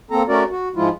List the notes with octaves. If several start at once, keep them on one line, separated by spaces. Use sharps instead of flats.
A#3 C4 A4 A#5
A3 C#4 F#4 A#4 D5
F#4
G#2 F3 G#3 E4 F4